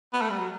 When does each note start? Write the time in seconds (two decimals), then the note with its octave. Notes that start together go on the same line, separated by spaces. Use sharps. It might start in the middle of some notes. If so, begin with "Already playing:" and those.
0.13 B3
0.22 A3
0.30 G3
0.39 F#3